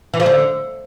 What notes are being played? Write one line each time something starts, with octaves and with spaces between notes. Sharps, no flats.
E3
F3
D3